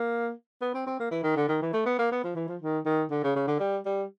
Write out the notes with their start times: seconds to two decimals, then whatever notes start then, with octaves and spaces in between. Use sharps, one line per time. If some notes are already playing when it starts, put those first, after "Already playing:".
Already playing: A#3
0.61 B3
0.74 C4
0.86 C4
1.00 A#3
1.11 E3
1.23 D#3
1.37 D3
1.49 D#3
1.62 E3
1.73 A3
1.86 B3
1.98 A#3
2.12 B3
2.24 F3
2.35 E3
2.48 F3
2.61 D#3
2.86 D#3
3.10 D3
3.24 C#3
3.36 C#3
3.47 D3
3.60 G3
3.86 G3